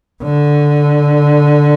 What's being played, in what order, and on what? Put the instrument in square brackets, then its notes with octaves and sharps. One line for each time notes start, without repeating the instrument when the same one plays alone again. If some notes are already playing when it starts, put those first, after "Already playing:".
[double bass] D3